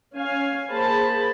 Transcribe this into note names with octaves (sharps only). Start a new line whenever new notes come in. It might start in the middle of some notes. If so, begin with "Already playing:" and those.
C#4 F5 G#5
A#3 G#4 C5 A5 B5